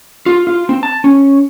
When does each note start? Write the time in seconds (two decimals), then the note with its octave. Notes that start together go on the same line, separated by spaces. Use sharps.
0.26 F4
0.47 F4
0.69 C4
0.83 A5
1.04 C#4